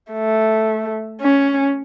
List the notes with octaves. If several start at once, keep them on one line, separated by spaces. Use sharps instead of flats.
A3
C#4